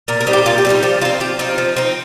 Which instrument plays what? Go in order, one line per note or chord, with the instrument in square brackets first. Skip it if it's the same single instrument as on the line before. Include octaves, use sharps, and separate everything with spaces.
[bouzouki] A#2 A#4
A#4
G3 C4 D#4
G4
A#2 F4
G4
G3 C4
D#4 F4
F3 G4
D#4 F4
C4
F3 G4
C4 D#4 F4
F3
C4 D#4